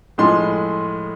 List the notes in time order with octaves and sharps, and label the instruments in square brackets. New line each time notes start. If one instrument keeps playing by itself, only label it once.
[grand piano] A2 F3 G#3 C6